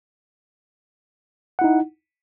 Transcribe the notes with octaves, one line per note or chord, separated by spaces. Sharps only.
D#4 E4 F#5